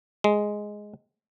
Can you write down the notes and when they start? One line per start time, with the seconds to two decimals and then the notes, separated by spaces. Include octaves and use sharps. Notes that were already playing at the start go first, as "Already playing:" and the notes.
0.24 G#3